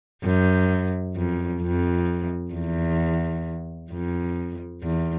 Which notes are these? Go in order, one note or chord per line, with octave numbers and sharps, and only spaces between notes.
F#2
F2
F2
E2
F2
E2